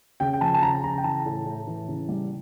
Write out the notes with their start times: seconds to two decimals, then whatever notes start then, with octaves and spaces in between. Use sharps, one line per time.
0.20 C#3 G5
0.33 G5
0.41 F3 A5
0.54 A5
0.62 C#3 A#5
0.83 C#3 A#5
0.98 G5
1.04 E3 A5
1.26 A2
1.46 A2
1.67 E3
1.88 C#3
2.09 G3